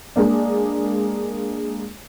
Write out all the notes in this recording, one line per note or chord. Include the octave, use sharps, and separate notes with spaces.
G#3 A#3 D4